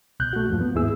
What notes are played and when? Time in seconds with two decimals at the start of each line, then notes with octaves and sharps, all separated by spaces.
0.20 C2 B2 F#6 G6
0.33 A3 F#4
0.49 E2 G2 F3
0.61 B3
0.74 D#2 G#2 B3 E4 G#4 E6